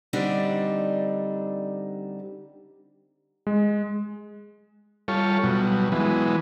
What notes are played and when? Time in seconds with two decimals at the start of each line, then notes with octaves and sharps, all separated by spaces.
0.13 D3 G3 C4 D4 D#4
3.47 G#3
5.08 G3 F4 A4 C#5
5.43 B2 F#3 G3
5.92 E3 F#3 G#3 B3